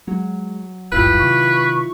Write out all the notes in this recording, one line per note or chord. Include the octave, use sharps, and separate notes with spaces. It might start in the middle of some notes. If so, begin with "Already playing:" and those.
F#3 G#3
D#1 G#1 G2 E4 F4 G4 B4
C3 D#3 C#6